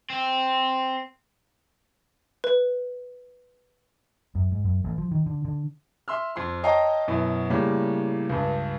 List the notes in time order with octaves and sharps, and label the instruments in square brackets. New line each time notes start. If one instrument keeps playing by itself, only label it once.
[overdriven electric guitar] C4
[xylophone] B4
[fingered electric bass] F#2
G#2
F#2
A1
F3
D#3
D3
D3
[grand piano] E5 C6 E6 F6
F2 C6
C#5 D#5 F5 G5 A5 A#5
F#2 B2 E4
A2 C#3 G3 A#3
C#2 G2